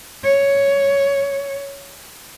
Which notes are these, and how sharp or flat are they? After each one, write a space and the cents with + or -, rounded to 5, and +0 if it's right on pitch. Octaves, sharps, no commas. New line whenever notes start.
C#5 +5